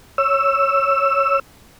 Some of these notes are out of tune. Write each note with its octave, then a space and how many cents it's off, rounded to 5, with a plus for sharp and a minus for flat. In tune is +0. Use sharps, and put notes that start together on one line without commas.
C#5 +0 E6 +10